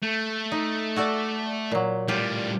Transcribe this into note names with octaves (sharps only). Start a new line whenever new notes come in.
A3
D#4
F#4 A4 D5
A#2 F#3
A2 G3 F4 G4